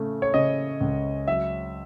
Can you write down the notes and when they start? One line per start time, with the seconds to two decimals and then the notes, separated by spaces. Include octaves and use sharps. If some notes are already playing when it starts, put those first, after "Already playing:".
Already playing: C#3 A3
0.22 C#5
0.34 C#3 D#5
0.81 C#2
1.28 F#3 E5